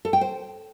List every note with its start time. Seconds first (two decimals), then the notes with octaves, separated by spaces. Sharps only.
0.05 A4
0.13 G5
0.21 C5